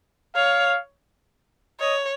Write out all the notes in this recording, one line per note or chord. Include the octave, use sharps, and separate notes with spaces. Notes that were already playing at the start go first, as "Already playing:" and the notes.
C#5 F5
C#5 D#5